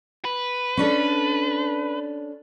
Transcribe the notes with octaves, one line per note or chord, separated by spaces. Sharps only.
B4
C#4 D4 A4